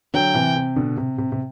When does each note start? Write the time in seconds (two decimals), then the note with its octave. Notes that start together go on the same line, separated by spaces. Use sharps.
0.14 D3 F#3 G5
0.34 C3 E3
0.56 C3
0.76 B2 D3
0.97 C3
1.18 C3
1.32 C3